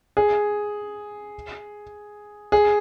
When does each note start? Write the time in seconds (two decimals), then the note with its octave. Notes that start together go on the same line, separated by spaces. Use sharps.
0.17 G#4
2.52 G#4